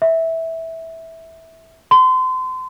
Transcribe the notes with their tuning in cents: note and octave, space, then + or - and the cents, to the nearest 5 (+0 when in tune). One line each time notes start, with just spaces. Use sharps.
E5 -15
C6 -30